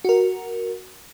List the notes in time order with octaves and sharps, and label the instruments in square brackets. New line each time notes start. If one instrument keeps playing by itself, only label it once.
[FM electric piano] F#4 A#4